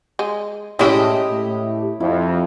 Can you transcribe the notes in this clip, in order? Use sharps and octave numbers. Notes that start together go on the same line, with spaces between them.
G#3
A2 G#3 C#4 E4 G4 D#5 E5
A2
F2 E4